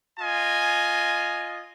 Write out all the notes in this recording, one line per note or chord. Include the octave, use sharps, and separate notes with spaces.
F4 D#5 G#5